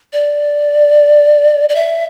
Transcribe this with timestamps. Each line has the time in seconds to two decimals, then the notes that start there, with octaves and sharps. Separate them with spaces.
0.13 D5
1.69 D5
1.75 E5